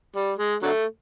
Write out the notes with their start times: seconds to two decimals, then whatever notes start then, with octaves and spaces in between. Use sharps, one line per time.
0.16 G3
0.38 G#3
0.63 D3 F#3 A3